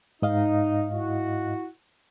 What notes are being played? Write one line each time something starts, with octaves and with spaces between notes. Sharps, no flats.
G#2 D#4 D#5 F5
E4 F#4